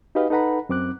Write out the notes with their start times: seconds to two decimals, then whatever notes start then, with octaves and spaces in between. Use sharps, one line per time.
0.15 D#4 F#4 G4 B4 D#5 F5
0.30 D#4 A4 B4 F#5 A#5 B5
0.69 F#2 C4 D6 F#6